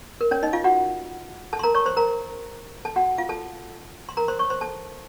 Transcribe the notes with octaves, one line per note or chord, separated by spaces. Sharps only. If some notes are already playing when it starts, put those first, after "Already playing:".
A#4
C#4 C#5
D#4 D#5
F4 F5
F#4 F#5
A4 A5
C6
A#4 A#5
C#5 C#6
C5 C6
A#4 A#5
A4 A5
F#4 F#5
F4 F5
A4 A5
C6
A#4 A#5
C5 C6
C#5 C#6
C5 C6
A4 A5